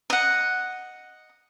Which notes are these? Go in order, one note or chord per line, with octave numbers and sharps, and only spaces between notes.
D#5 F#5